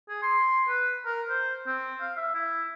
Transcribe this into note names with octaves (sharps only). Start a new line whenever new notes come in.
G#4
C6
B4
A#4
C5
C4
F5
E5
E4